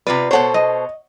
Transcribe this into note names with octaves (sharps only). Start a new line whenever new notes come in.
C3 F4 B4 D5
B2 A4 C5 C#5 F#5
D#5